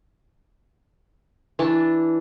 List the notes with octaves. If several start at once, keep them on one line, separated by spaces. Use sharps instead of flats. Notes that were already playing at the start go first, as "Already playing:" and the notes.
E3 D4 A5